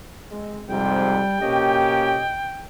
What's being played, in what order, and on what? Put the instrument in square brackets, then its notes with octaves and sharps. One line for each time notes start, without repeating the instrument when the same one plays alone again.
[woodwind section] G#3 C4
[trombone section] F2 G#2 C3 [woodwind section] G3 [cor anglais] G5
[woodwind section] F2 B2 D#5 [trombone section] A#3 C#4 G4